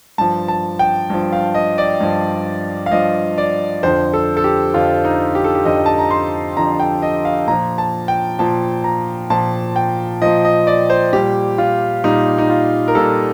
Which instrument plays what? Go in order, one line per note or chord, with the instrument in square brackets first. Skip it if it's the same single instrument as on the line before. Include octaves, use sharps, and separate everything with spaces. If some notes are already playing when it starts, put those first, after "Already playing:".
[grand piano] G2 F3 A5
A5
G5
G2 F3
F5
D#5
D5
G2 F3
F5
G2 F3 D#5
D5
F2 D3 F3 C5
A4
A4
G4
F2 D3 F3 F4
D#4
G4
A4
G4
F2 D3 F3 D#5
A5
A#5
C6
F2 D3 F3 A#5
G5
D#5
F5
A#2 F3 A#5
A5
G5
A#2 F3 A5
A#5
A#2 F3 A5
G5
A#2 F3 D#5
D#5
D5
C5
A#2 G3 G4
F4
A#2 G3 D#4
D#4
F4
A#4
A#2 G3 A4